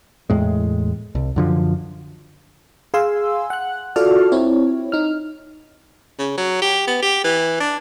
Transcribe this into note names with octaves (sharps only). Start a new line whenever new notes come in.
E2 A2 G#3
C2
F#2 D3 F3
G#4 F5 G#5 C6 E6
F#5 F#6
F4 F#4 A4 D5 A5 F6
C4 E4 C#5
D#4 F6
C#3
F#3
G4
B3
G4
E3
D4